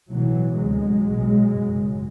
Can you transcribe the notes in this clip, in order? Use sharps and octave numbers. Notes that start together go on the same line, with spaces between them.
B1 A2 E3 F#3
D2 C3 F#3 G#3
B1 A#2
G#1 F#2 C#3